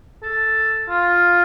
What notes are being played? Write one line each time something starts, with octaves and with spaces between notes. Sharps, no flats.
A4
F4